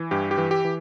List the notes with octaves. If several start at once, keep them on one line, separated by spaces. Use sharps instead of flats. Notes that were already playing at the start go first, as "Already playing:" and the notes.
Already playing: E3
G2 G4
G4
E3
G4
E3